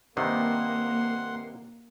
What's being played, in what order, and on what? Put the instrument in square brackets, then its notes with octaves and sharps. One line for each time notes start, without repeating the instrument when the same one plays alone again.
[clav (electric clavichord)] G2 C3 D#3 [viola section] A#3 [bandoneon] F#5 C6